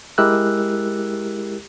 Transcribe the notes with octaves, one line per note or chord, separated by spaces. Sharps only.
G#3 E4 G4 A#4 E6 F#6